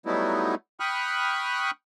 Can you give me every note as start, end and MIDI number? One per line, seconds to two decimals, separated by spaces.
0.06 0.55 54
0.06 0.55 55
0.06 0.55 57
0.06 0.55 59
0.06 0.55 63
0.06 0.55 64
0.80 1.71 79
0.80 1.71 83
0.80 1.71 85
0.80 1.71 87
0.80 1.71 89
0.80 1.71 90